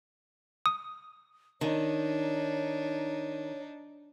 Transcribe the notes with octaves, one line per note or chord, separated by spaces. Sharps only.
D#6
D#3 D4 D#4 C#5